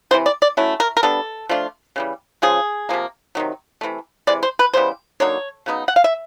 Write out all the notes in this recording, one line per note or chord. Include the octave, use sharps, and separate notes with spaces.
C3 E3 G3 C4 C5
D5
D5
F#3 A3 C#4 E4
A#4
A#4
G3 B3 D4 A4
F3 A3 D4 F4
C#3 E3 G3
C#3 F3 G#3 G#4
C3 F3 A#3
C3 D#3 F#3
C3 E3 A3
C3 E3 G#3 D5
C5
B4
C#3 E3 G3 B3 C5
D3 F#3 A#3 D#4 C#5
C#3 F#3 B3 D#4
F#5
F5
E5